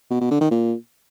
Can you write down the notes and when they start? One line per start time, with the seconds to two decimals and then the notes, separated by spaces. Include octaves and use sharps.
0.11 B2
0.21 B2
0.31 D3
0.41 D#3
0.51 A#2